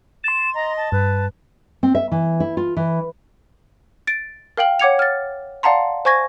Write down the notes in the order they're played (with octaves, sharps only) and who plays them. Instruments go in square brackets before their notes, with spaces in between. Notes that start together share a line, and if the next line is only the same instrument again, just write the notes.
[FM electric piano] C6 A6 [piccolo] E7
[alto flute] D#5 [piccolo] A#5
[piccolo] A5
[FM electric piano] G2 [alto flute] B4
[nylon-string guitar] C4
E5
E3
E4
F4
E3
[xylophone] A6 D7
A#4 F5 G5 F#7
C#5 F#5 D6 G#6 C#7 F7
F6 A6
D5 F5 F#5 A5 A#5 C6
C5 G#5 C#6 G#6 A#6